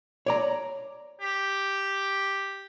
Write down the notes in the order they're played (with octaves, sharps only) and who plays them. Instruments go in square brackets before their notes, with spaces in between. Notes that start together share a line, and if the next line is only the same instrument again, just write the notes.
[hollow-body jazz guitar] C#5 D5 A#5
[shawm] G4